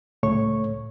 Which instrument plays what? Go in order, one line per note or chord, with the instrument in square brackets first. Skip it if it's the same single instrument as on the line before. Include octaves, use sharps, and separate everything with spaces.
[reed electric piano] C#2 A2 A3 C#5 C#6